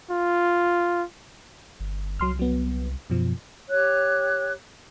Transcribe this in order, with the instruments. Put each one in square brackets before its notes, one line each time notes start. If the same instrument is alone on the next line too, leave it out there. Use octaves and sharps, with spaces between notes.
[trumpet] F4
[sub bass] G1
[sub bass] C2 [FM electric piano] F#3 C6 F6
[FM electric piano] F#3 B3
F#2 B2 F3
[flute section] G4 C#5 F#6